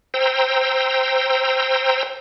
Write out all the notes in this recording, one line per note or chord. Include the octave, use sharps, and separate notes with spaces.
C5 G5 A#5 E6